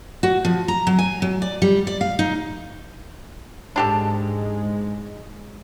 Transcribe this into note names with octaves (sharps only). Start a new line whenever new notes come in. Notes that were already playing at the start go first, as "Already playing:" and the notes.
F#4
F3
A#5
F#3
G#5
F#3
D5
G3
D5
F5
D#4
G#2 G#3 D4 G4 A4